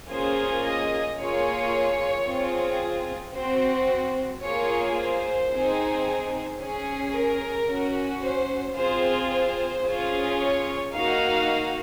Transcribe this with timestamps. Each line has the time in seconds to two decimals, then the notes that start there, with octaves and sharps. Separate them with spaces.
0.10 A#3 C#4 F4 G#4 C5
0.65 D#5
1.19 A#3 F4 G#4 C#5
2.28 C4 F4 G#4
3.35 C4 F#4 C5
4.44 A#3 F4 G#4 C#5
4.98 C5
5.53 C4 D#4 G#4
6.61 C#4 G#4
7.15 A#4
7.69 C#4 F#4
8.23 C5
8.77 C4 F4 G#4 C5
9.32 C5
9.85 C#4 F4 G#4
10.40 C#5
10.94 A#3 D#4 F#4 F5